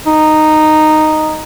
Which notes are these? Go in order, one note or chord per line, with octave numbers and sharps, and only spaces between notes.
D#4